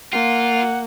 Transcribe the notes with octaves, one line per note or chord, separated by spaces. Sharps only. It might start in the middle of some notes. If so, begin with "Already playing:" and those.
A#3 F4 F#5